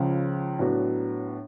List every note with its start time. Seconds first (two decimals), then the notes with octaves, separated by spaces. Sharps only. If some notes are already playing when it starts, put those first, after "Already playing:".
Already playing: C#2 C#3 F3
0.59 A2 F#3 B3 D4 F#4